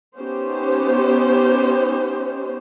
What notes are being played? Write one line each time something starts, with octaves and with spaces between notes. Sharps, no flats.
B3 C#4 D#4 G4 C5